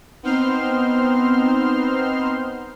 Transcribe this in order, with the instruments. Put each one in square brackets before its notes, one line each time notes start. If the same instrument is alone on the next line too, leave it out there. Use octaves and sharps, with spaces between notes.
[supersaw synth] B3 C4 D#4 C5 C6 F6